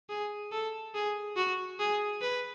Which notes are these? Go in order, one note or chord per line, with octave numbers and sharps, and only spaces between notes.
G#4
A4
G#4
F#4
G#4
B4